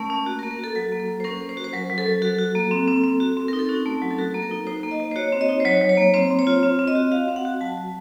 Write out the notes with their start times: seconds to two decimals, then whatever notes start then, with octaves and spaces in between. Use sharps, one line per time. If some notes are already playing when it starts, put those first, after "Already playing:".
Already playing: A3 C#4 A#4
0.10 C#4
0.26 A#3 F#4
0.39 A#4
0.43 A#3
0.51 A#4
0.59 F#4 A4
0.75 F#3 A4
0.92 A#3
1.00 A4
1.08 A#3
1.20 C5
1.24 C#4 A#4
1.41 C#4
1.49 C5
1.57 F#4
1.64 C5
1.73 F#3 A#4
1.90 F#3
1.98 A4
2.06 F#3
2.22 F#4 A4
2.39 F#4
2.55 A#3
2.71 C4
2.88 C4
3.04 C4
3.20 F#4
3.37 C4
3.48 D#4 A#4
3.59 A4
3.69 C#4 F#4
3.86 A3
4.02 F#3
4.11 A4
4.18 F#4 A#4
4.34 A#3
4.42 A#4
4.51 D#4
4.67 D#4 C5
4.83 A#3
4.91 D#5
5.00 A#3
5.11 C5
5.16 F#4 C#5
5.33 C4
5.41 D#5
5.49 D#4
5.60 C5
5.65 F#3 C#5
5.81 F#3
5.89 C#5
5.97 A#3
6.14 C4 C5
6.31 C4
6.39 C#5
6.47 F4
6.63 C4
6.79 C4
6.88 D#5
6.95 F#4
7.12 F#4 F5
7.28 C4
7.36 F#5
7.45 F#4
7.61 F#3 A5
7.78 F#3